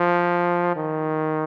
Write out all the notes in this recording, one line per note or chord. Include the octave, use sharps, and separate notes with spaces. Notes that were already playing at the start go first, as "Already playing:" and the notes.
Already playing: F3
D#3